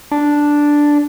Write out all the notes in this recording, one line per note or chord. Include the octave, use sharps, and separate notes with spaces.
D4